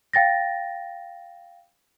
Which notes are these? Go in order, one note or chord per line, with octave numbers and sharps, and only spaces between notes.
F5 G5 A6 A#6